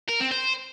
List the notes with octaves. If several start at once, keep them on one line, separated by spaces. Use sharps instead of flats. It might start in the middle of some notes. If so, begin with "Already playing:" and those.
A#4
C4
C5